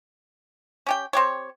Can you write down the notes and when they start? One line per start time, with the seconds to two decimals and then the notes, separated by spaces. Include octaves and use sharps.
0.87 C#4 G4 G5
1.13 C4 G4 C#5